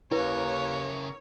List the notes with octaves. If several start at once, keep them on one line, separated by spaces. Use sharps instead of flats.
D#2 C#3 E4 A#4 B4 C#5